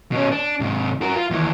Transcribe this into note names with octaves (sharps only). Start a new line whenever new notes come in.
B2 C#4
D4
G#2 C3
F#4 A#4
F4
D#2 E3